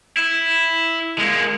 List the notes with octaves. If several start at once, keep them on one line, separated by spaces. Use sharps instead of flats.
E4
G#3 A#3